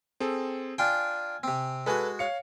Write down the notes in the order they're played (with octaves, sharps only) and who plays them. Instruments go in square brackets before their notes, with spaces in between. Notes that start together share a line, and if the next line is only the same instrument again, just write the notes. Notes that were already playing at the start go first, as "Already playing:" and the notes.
[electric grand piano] C4 G#4 A4
[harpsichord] D4 F4 G5 [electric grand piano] G#5
[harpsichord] C3 C4
[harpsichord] G#3 F#4 [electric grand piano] A4 B4 G#5
[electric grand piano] C#5 F5 C#7